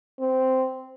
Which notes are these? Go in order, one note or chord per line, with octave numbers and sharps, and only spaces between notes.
C4